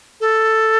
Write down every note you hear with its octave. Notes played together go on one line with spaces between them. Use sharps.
A4